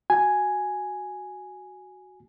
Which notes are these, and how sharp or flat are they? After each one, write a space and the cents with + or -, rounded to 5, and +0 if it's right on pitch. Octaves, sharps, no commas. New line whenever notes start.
F#4 +0 G#5 +0